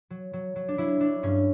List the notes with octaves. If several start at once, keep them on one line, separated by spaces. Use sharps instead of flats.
F#3
F#3
F#3
D4
F#3 E4
F#3 D4
G2 C#4